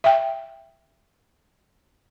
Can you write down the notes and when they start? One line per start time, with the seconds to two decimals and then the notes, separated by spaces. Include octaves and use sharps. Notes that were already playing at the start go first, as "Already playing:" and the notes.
0.04 E5 G5